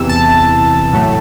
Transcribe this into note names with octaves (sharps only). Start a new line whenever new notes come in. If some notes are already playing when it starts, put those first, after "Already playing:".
Already playing: E2 C3 E3 E6
A5
A2 F#3 A3